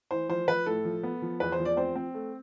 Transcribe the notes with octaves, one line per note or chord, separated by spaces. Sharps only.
E3 C5
F3 C5
F3 B4
A2 A4
F3
B3
F3
E2 B4
C5
F3
D5
C4 C5
C4
A3